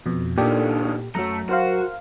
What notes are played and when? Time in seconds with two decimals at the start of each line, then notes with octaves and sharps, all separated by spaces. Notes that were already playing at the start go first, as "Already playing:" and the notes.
0.06 F2 B2
0.37 C#2 A#2 D#3 A#3 D4 G4 A4
1.15 F#2 F#3 A3 A#5
1.49 F#4 A#4 C5 F5